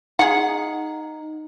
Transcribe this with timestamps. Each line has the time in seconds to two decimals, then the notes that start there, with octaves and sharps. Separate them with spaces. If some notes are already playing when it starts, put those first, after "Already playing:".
0.19 D#4 G#4 F#5